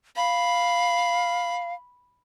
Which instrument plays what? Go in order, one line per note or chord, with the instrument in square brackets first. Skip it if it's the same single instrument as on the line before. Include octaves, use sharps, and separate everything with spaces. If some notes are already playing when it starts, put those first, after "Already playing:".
[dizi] F5 [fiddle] B5